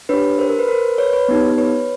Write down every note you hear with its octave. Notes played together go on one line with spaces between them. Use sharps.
D4 G4 B4 C#5
A#4 C5
A#4
B4
A#4 C5
B4 C#5
B4 C#5
B3 D#4 G4
B4 C#5